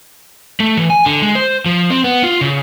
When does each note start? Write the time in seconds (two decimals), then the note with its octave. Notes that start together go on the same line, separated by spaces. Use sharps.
0.60 A3
0.77 E3
0.90 G#5
1.06 D3
1.22 G#3
1.35 C5
1.66 F3
1.90 C4
2.04 B3
2.24 F4
2.41 C#3